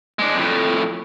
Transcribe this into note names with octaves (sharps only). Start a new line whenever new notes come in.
G#3 D4
F2 A2